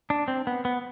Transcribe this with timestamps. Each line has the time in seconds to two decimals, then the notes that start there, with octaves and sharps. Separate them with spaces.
0.10 D4
0.28 C4
0.47 B3
0.65 B3